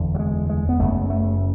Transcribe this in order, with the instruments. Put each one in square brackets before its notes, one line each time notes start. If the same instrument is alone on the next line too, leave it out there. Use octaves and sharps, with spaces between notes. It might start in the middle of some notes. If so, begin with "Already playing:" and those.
Already playing: [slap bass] F#1 E2 D3
F#3
G#3
G#3
B3
F#1 F#2 C#3 A3
A3